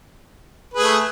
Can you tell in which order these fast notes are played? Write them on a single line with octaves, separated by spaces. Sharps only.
B4 G#4 A3